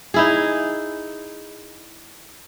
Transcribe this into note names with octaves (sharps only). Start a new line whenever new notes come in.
D#4 E4 G#4